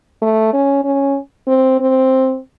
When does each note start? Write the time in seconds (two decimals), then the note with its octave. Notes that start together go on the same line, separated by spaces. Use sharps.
0.22 A3
0.53 C#4
0.84 C#4
1.47 C4
1.80 C4